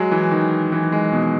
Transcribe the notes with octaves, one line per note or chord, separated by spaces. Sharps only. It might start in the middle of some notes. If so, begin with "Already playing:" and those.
Already playing: F#3 G#3
E3
D#3
E3
G#3
B2